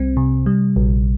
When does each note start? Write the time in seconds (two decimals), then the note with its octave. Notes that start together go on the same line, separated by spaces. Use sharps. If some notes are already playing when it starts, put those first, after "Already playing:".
Already playing: C2 G3 C4
0.17 C3
0.46 G3
0.76 A#1